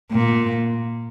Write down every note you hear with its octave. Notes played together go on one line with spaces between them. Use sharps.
A#2